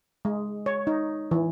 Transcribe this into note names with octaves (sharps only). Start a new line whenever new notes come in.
G#3
C#5
D#4
E3